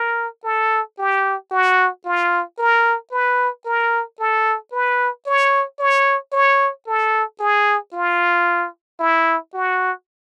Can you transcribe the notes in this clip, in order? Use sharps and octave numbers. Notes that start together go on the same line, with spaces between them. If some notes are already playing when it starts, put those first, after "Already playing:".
Already playing: A#4
A4
G4
F#4
F4
A#4
B4
A#4
A4
B4
C#5
C#5
C#5
A4
G#4
F4
E4
F#4